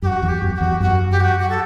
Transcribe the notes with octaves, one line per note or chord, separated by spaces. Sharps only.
F#2 G4
F#4
E2
G4
F#2
G4
E2 F#4
F#2 F#4
G4
F#4
F#4
A4